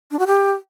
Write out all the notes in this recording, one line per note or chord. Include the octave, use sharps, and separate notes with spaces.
D4
F#4
G4